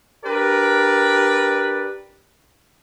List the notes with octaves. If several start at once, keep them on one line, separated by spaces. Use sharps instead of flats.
D4 G4 A#4 B4 D5